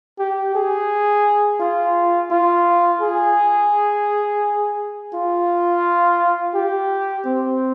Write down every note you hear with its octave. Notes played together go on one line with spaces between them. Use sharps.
G4
G#4
F4
F4
G#4
F4
G4
C4